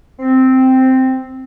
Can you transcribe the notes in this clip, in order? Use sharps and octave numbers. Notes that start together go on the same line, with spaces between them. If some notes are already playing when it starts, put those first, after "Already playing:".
C4